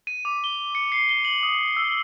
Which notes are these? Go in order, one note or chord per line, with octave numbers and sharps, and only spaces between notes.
D#7
D6
G7
C#7
C7
G7
F#7
D#6
E6